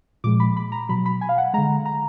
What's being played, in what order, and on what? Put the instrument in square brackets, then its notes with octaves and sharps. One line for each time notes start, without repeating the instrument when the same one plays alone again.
[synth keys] A#2 F3 G#3 D6
B5
B5
A#5
B2 F#3 B5
B5
G#5
F5
F#5
D3 G#3 A#5
A#5